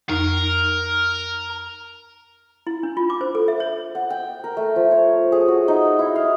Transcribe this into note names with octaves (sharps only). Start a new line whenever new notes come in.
F2 D#4 A#4
E4
D4
F4
D6
C5
A4
E5
C#5
F#5
G5
A#4
A3
F3
C#5
G#4
F#4
D#4
E4
F5